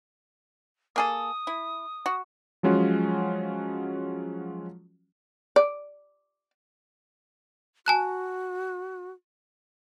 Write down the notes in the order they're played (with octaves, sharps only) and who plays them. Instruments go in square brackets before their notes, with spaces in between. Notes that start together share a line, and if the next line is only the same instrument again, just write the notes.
[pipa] A#3 G#4 A4 [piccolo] D#6
[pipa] E4
F#4
[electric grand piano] F3 F#3 G#3 C#4 F4 F#4
[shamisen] D5
[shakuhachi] F#4 [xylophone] G#5 A5 F#6